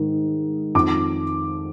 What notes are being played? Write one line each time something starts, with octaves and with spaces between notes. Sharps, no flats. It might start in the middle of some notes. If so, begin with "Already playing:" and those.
Already playing: G#2 D#3
F2 D#3 D6